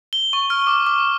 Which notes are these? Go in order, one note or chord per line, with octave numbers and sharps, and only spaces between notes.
G7
C#6
F6
D6
D6